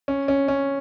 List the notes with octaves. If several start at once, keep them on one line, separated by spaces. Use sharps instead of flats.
C#4
C#4
C#4